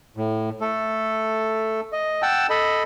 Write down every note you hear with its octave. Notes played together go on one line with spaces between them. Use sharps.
A2
A3 A4
D#5
F#5 G5 A5 E6
A4 D#5 B5